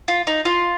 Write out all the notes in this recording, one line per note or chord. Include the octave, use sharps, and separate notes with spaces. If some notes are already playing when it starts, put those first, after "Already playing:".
F4
D#4
F4